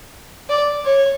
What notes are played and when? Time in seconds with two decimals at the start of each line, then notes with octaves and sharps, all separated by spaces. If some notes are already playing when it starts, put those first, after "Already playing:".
0.49 D5
0.85 C#5